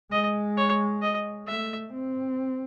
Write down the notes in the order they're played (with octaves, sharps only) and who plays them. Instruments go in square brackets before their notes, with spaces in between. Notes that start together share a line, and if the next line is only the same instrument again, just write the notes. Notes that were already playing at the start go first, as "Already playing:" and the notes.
[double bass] G#3 [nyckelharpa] D#5
[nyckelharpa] C#5
D#5
[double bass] A3 [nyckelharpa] E5
[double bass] C4